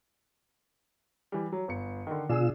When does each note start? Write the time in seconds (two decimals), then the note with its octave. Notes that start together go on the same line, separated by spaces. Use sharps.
1.32 E3 G3
1.52 F#3
1.68 G1 C#7
2.07 D3 D#3
2.29 B2 D4 F4 G#4 E6